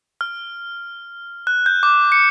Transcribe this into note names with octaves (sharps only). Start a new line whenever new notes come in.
F6
F#6
G6
D6
C#7